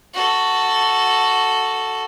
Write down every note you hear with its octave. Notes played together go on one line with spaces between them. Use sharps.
F#4 A4